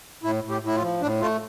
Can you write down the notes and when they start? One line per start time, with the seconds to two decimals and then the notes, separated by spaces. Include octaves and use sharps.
0.23 A2 E4
0.44 A2
0.50 G4
0.63 A2 E4
0.75 F4
0.82 F3
1.01 A2 D4
1.21 A3 F4